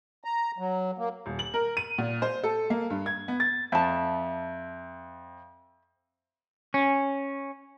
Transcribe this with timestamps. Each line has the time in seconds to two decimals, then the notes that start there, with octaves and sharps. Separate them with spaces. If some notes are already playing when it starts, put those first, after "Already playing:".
0.24 A#5
0.58 F#3
0.98 A#3
1.26 D#1
1.39 F#7
1.54 A#4
1.77 D#7
1.98 A#2
2.22 C5
2.44 A4
2.70 A#3
2.90 G2
3.06 G#6
3.28 B3
3.40 A6
3.72 F2 E5 A5
6.74 C#4